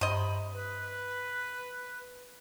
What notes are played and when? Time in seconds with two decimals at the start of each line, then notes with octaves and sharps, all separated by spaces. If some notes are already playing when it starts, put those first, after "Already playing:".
0.01 G2 C3 D#5 B5 C6
0.53 B4